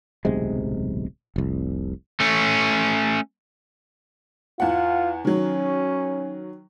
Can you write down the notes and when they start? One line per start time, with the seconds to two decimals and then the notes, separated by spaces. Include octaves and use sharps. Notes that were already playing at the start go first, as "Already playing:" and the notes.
0.25 D1 B1 C3 G#3
1.36 F1 C2
2.20 A3 C#4
4.60 E2 F4 F#5
5.25 D#3 F#3 C#4